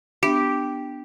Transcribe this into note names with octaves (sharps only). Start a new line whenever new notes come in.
B3 D4 G4 E5